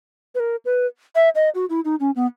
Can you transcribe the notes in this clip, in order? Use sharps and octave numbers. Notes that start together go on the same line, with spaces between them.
B4
A#4
B4
E5
D#5
F#4
E4
D#4
C#4
B3